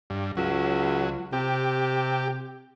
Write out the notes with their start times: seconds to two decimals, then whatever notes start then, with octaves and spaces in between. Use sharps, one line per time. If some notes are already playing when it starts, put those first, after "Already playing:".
0.10 G2
0.37 C#2 F#3
1.33 C3 G4